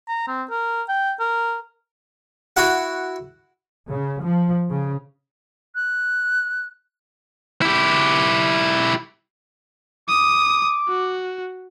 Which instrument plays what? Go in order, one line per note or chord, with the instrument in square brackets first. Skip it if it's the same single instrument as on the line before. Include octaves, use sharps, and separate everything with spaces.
[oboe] A#5
C4
A#4
G5
A#4
[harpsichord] E4 F#4 F#5
[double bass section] C#3
F3
C#3
[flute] F#6
[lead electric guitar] E4 G4
[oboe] D6 [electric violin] D#6
[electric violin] F#4